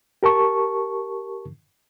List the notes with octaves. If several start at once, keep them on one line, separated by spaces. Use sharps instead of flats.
G4 A#4 A5 C#6